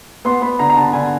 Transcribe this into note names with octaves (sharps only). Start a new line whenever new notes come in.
B3 C6
B3 B5
D3 A#5
A#5
D3 A5
D3 G#5